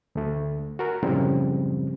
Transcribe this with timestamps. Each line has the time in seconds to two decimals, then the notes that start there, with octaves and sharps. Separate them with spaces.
0.15 D2 A3
0.79 F#4 A#4
1.03 F#2 A2 C#3 F3 G3 C4